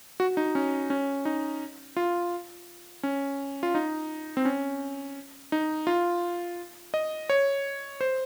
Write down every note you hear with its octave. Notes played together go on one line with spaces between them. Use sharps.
F#4
D#4
C#4
C#4
D#4
F4
C#4
F4
D#4
C4
C#4
D#4
F4
D#5
C#5
C5